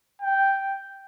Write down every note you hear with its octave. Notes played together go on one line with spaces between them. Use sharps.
G5